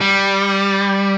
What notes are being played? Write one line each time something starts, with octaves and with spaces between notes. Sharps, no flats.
G3